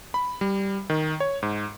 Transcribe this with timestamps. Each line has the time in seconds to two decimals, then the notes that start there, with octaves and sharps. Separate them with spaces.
0.14 B5
0.41 G3
0.90 D#3
1.20 C#5
1.43 G#2